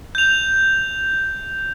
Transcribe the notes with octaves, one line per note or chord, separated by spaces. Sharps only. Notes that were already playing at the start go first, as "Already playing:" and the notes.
G6 F7